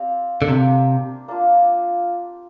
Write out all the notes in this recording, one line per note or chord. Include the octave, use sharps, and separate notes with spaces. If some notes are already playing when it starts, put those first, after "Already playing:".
Already playing: C4 G4 D5 F5
D3
C3 A#3 D4 G4
A#3 D4 F4